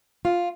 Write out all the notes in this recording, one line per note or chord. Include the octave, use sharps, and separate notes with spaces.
F4